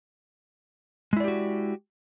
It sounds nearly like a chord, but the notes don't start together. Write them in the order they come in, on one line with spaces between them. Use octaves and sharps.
G#3 E4 D5 G4 F#4